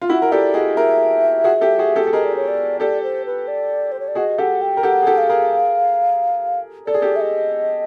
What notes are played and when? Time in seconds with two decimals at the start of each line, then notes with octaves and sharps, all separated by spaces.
0.02 F4
0.09 E4 F#4 F#5
0.22 A#4
0.32 G4 A4 D5
0.54 F#4 G#4 D#5
0.77 G#4 A#4 E5
1.44 F#4 G#4
1.61 G4 A4
1.79 F#4 G#4
1.96 G4 A4
2.07 A4
2.13 G#4 A#4 D#5
2.24 D5
2.36 C#5
2.48 D5
2.80 G4 A4 D5
3.03 C5
3.26 B4
3.48 D5
3.92 C5
4.00 C#5
4.08 D5
4.15 F#4 G#4 D#5
4.38 G4 A4 F#5
4.61 G5
4.77 A#4
4.83 G4 A4 F#5
5.02 G#4
5.07 G4 A4
5.18 F5
5.29 G#4 A#4
6.87 A4 D5
6.94 G#4
7.02 G4 A4
7.16 E5
7.21 D#5